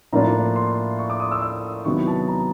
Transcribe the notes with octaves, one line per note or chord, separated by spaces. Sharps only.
A2 F3 A#3 D4 F4 A#5
C6
C#6
D6
D#6
E6
E6
C3 D#3 F#3 B3 E4 C#6
A5
A#5